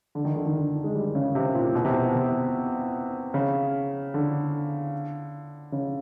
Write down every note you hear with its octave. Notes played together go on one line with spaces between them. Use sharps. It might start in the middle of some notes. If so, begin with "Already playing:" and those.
D3
D#3
D3
D#3
D3
G#3
G3
C#3
C3
A#2
B2
C3
B2
C3
C#3
D3
C#3